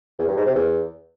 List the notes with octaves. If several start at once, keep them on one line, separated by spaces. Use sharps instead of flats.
E2
G2
G#2
C3
E2